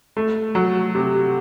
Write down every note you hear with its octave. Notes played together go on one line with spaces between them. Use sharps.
A3
F#3
C3